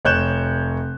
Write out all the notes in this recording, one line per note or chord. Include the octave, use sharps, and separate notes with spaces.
F1 C#5 F#6 G6 E7